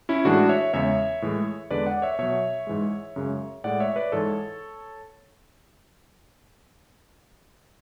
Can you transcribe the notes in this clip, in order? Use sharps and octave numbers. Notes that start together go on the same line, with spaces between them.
C#4 E4
A2 E3 G#3 D4 F#4
C#5 E5
E2 C#3 G#3 C#5 E5
A2 E3 G#3
E2 D3 G#3 B4 D5
D5 F#5
C#5 E5
B2 F#3 C#5 E5
G#2 E3 G#3
F#2 C#3 G#3
A2 G#3 D5 F#5
C#5 E5
B4 D5
G#2 E3 G#3 A4 C#5